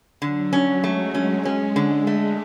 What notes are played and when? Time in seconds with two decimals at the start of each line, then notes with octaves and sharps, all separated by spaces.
0.22 D3 F#3
0.53 C#4
0.83 G#3 A3
1.14 G#3 C#4
1.45 C#4
1.76 D3
2.07 G#3 A3